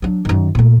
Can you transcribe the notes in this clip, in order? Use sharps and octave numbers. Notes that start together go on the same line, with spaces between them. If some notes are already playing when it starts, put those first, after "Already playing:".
F#3 D4
F#2 D#3
A#2 A3